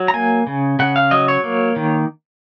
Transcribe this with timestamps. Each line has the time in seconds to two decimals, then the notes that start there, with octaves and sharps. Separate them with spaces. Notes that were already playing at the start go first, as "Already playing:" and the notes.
Already playing: F#3
0.08 A#5
0.14 A#3 G#5
0.47 C#3
0.79 C#3 F#5
0.96 F5
1.11 F#3 D#5
1.28 C#5
1.44 A#3
1.76 D#3